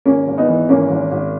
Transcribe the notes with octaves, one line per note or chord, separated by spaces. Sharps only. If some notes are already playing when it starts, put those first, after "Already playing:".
G#1 A#3 C#4
G#1
B3 D#4
E3
G#1 A#3 C#4
G#1
G#1